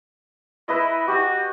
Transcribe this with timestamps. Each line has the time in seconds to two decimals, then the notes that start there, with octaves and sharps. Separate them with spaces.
0.69 E4 B4 D#5
1.08 F#4 G4